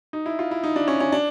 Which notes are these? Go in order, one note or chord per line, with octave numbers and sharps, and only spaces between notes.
D#4
E4
F4
E4
D#4
D4
C#4
C#4
D4